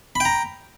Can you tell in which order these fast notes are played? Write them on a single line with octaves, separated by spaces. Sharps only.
B5 G5 A#5